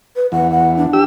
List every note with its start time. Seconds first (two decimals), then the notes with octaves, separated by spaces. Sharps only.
0.16 B4
0.32 E2 F#5
0.51 F#5
0.77 D4
0.93 G4 E6